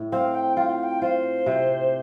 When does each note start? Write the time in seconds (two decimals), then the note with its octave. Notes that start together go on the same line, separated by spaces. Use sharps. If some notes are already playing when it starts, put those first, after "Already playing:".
Already playing: A2
0.12 C4 F5
0.34 G5
0.57 F4 G5
0.69 F5
0.83 G5
1.01 F4 C5
1.46 C3